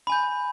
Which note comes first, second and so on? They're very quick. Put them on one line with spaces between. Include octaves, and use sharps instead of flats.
B5 G#5 G6